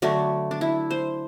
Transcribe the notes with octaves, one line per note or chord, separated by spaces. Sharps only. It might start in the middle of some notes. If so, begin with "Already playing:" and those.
D3 F#3 A3 D4
D4
E4
C5